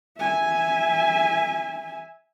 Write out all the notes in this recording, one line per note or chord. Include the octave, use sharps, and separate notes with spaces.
E5 G#5